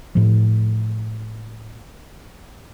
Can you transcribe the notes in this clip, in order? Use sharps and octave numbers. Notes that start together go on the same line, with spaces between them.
A2 F3